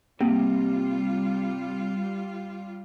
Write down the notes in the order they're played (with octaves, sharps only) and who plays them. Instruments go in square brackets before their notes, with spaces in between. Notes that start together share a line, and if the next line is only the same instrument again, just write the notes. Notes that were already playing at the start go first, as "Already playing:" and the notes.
[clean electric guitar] C3 [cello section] G3 F4 [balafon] A#3